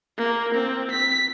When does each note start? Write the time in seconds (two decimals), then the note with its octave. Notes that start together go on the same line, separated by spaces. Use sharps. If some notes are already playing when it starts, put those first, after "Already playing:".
0.18 A#3
0.55 C4
0.91 B6